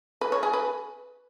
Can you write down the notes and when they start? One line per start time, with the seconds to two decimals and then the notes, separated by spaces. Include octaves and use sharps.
0.21 B4
0.32 C#5
0.43 G#4
0.53 B4